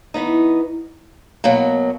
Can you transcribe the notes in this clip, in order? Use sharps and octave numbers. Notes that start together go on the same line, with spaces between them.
E3 B3 D#4
B2 F#3 A#3